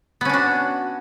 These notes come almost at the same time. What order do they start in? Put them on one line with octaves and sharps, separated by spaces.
B3 C#4 D4 F#4